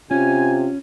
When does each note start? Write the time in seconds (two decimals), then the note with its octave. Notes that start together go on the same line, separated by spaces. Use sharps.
0.11 C3 C#4 F4 G#5